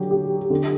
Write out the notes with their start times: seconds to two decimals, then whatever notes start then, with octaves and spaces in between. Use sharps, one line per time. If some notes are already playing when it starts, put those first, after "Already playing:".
Already playing: D3 F#3 G4
0.11 G4
0.50 D3